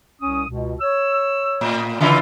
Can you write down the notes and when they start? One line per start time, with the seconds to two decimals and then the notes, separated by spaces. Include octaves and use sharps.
0.21 C2 C#4 D#6
0.48 C#2 B2
0.80 C#5 E6
1.61 A2
2.00 C#3 E3 E4 F4